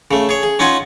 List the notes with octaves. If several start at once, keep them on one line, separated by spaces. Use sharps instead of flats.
C#3 A3
G#4 C#5
G#4
C#4 D#4 F4 F#5 G#5